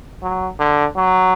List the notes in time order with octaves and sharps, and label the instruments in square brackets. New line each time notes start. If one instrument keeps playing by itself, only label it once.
[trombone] F#3
D3
F#3